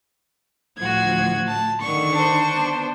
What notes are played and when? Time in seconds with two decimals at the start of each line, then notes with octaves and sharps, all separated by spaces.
0.78 D2 A2 F3 F#4 G#6
1.48 A5
1.81 D3 D#3 C#6
2.13 D4 C5
2.54 B3